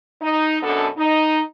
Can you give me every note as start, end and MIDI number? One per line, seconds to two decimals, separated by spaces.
0.22 0.58 63
0.63 0.88 42
0.63 0.88 47
0.63 0.88 59
0.63 0.88 62
0.63 0.88 69
0.98 1.40 63